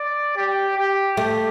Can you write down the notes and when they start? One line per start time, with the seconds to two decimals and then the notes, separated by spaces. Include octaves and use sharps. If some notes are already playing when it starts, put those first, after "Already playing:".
Already playing: D5
0.36 G4
0.77 G4
1.17 A3 G4